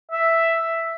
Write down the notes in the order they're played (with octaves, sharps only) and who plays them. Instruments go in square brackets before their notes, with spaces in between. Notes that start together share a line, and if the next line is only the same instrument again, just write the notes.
[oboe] E5